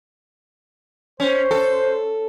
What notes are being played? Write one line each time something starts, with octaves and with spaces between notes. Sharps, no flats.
C#4 C5
A4